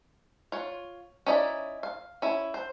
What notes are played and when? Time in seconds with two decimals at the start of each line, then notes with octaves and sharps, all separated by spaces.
0.52 F4 C#5
1.26 C#4 D#4 E4 D5
1.83 F5
2.22 C#4 E4
2.54 C5